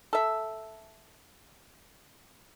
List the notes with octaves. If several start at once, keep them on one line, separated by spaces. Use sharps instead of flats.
A4 E5